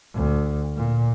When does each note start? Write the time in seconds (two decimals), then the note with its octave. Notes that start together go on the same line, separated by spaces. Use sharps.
0.15 D2
0.77 A#2